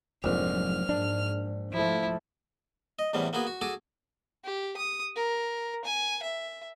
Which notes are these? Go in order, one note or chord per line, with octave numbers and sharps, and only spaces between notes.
F1 A#1 F2 G#2 F#3 F6
G#2 D4
F3 A3 E4
D#5
E2 A2 C3 G3 B3 C#4
A#3 B3 F#4 G#4 B4
F#4
F#4 G#4 A4 D6 D#6
G4
D#6
A#4
G#5
E5